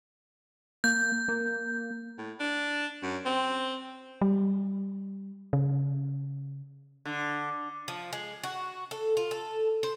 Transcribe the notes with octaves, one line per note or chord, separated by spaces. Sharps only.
A#3 G6
A#3
A2
D4
F#2
C4
G3
C#3
D3
F3
G#3
F#4
A4
F4
A4
C5